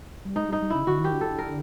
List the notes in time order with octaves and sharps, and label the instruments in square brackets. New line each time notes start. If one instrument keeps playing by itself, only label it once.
[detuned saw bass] G3
[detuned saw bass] G#3 [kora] D#4
[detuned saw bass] G3 [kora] D#4
[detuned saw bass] G3
[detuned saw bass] C#3 [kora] E4
[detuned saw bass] D3 [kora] F#4
[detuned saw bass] D#3 [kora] G4
[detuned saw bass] D3
[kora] A4
A#4